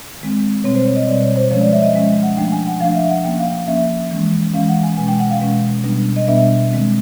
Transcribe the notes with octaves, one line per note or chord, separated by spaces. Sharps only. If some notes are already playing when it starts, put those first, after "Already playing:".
D#3 G#3 C4
B2 G3 C4 C#5
C5
C#5
D#5
B2 G3 C4 D5
C#5
C5
F3 G#3 C#4 C#5
D5
E5
D#5
F3 G#3 C#4 E5
F#5
F3 A3 D4 G5
G#5
F#5
F3 A3 D4 F5
E5
F#5
F3 A#3 C#4 G5
F5
F3 A#3 C#4 E5
E3 G#3 C#4
E3 G#3 C#4 F5
F#5
G#5
B2 G#3 C#4 G#5
G5
F#5
F5
B2 G#3 C#4
B2 G3 B3 D4
D#5
B2 G3 B3 D4 E5
D#3 G#3 C4